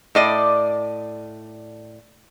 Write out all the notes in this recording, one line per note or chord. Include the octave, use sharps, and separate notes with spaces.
A2 D5 D#5